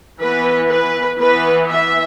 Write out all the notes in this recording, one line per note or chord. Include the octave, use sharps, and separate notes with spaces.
E3 B3 B4
B4
E3 B3 B4
E5